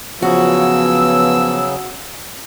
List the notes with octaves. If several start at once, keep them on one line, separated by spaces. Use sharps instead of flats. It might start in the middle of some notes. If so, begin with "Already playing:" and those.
C#3 F3 F#3 B3 F#4 E6